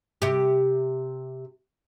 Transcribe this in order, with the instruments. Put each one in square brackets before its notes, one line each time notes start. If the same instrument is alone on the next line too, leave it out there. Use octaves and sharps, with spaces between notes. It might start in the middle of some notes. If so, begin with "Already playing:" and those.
[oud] C3 G4